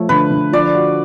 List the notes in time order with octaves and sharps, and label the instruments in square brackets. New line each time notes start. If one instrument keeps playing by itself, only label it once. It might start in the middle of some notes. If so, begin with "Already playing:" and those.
Already playing: [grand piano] F3 A3 C#5
[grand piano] D3 [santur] B4
[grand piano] D3
[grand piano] F3 [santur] D5
[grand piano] F#4